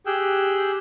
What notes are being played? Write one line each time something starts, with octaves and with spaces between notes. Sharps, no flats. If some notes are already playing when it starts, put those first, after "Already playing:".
G4 G#4 G5 E6 F#6